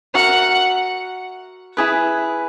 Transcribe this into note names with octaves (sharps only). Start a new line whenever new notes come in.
F#4 A#4 E5 F#5
E4 G#4 B4